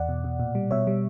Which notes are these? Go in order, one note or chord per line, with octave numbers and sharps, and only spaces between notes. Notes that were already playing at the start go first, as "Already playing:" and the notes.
Already playing: E2 D5 F#5
B2
B2
A#2
G3
B2 C#5 E5
G3